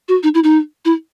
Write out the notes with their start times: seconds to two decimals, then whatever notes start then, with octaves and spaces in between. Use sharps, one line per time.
0.08 F#4
0.23 D#4
0.34 E4
0.44 D#4
0.85 E4